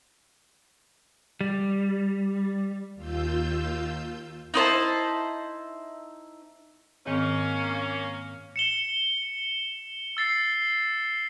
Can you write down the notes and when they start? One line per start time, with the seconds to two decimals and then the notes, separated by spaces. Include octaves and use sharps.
1.41 G3
2.95 D#2 F4 E6 G6
4.54 D#4 E4 C5 A5
7.06 G#2 D#3 A#3 C4 C#4
8.56 C#7 E7 G7
10.17 E6 A6 C7